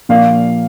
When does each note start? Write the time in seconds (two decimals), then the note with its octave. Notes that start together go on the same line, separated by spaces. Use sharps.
0.09 A#2 F3 A#3 D4 F5